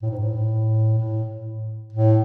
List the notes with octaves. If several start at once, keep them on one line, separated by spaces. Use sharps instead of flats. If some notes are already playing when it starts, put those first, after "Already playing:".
A2
G#2
A2
A2
A2